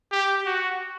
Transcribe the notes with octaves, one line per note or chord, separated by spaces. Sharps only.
G4
F#4